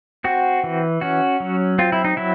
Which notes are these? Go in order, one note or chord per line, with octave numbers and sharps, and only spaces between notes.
C4 F#4
E3
C#4 F#4
F#3
C4 F4
E4
D#4
F#3 E4